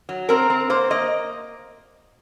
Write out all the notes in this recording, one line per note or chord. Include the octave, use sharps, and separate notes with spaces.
F#3
C4 A#4
C4
A#3 C5
A#3 D#5